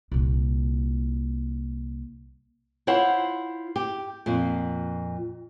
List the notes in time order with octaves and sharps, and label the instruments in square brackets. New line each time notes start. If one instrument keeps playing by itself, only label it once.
[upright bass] C2 A#2
[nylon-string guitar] E4 F4 C5 C#5 F#5
G4
F2 A#2